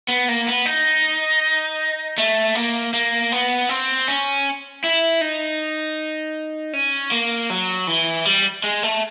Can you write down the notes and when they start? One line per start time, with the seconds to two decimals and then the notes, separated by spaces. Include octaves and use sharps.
0.08 B3
0.28 A#3
0.47 B3
0.66 D#4
2.18 A3
2.55 A#3
2.93 A#3
3.32 B3
3.69 C4
4.08 C#4
4.84 E4
5.21 D#4
6.73 C#4
7.12 A#3
7.50 F#3
7.87 E3
8.25 G3
8.64 G#3
8.83 A3